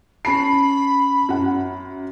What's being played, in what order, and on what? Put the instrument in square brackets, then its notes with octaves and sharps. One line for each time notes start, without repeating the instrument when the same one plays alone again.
[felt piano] C#4 A5 C7 [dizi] B5
[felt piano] F#2 F#5